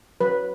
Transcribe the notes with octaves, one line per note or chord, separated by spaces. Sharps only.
F#3 B4